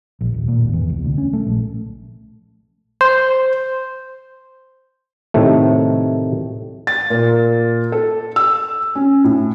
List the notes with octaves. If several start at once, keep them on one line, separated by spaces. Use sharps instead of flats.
A#1
D#1
A#2
G#1
E2
C2
D2
C#4
A3
A#1
C5
A2 C3 D#3 A3
A6
A#2
A4
E6
C#4
A2